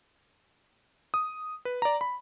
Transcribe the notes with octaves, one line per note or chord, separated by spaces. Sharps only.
D#6
B4
D5 A#5
B5